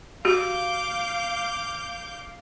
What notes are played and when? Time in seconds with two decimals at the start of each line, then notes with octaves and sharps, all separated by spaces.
0.25 F#4 G4 F5 D6 G6